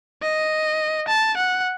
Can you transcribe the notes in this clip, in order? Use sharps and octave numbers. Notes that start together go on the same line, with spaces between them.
D#5
A5
F#5